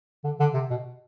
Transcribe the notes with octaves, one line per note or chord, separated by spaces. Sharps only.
D3
D3
C3
B2